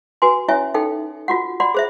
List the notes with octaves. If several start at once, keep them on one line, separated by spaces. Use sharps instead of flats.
F#4 B4 G#5 C6
C#4 E4 C#5 E5 G#5
D#4 A4 G5
F4 F#4 F#5
D5 F#5 B5 C6
G#4 C5 E5